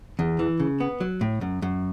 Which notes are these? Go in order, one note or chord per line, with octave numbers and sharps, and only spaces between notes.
E2
E3
C#3
B3
F#3
A2
F#2
F#2